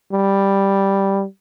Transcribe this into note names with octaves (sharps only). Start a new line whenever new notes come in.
G3